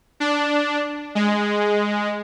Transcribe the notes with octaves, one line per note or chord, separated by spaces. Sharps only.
D4
G#3